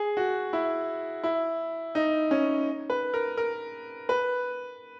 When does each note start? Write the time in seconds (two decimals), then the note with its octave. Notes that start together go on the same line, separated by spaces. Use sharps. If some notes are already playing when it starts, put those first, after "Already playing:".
Already playing: G#4
0.17 F#4
0.53 E4
1.24 E4
1.95 D#4
2.31 C#4
2.90 B4
3.14 A#4
3.37 A#4
4.09 B4